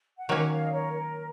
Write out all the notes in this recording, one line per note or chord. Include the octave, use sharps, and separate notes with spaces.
F#5
D#3 F#3 A#3 C#4 C#5 F5
C#5 F5
D#5
A#4 C#5
A#4